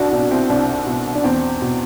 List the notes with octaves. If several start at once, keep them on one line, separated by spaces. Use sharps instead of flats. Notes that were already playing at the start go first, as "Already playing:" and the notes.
Already playing: C2 D4 F#4
B2 D4
C4 E4
C2 D4
B2
D4
E2 C4
B2